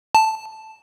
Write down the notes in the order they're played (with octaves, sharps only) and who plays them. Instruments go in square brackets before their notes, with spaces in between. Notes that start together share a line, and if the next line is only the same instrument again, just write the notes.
[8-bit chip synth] A5